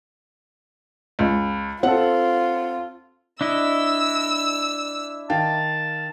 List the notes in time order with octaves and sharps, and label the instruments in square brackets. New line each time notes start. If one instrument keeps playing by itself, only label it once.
[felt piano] C#2
[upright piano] C4 A4 [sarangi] F4 [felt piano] F#5
[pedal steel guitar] D4 E4 D#5 [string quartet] E6
[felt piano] D#3 F5 G5 [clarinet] A5